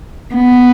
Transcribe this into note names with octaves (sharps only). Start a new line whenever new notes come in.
B3